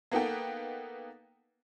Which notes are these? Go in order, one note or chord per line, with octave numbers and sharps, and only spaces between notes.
A#3 B3 D#4 A4 G5